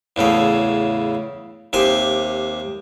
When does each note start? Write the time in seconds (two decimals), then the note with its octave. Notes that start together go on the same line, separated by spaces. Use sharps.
0.16 E2 A2 C#3 A4
1.73 D#2 C3 G#5 C6